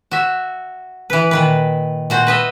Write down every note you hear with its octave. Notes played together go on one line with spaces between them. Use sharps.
F#4 E5
E3 B4
A#2 D#3 B4
A#2 F#4 C5
B4 D#5 E5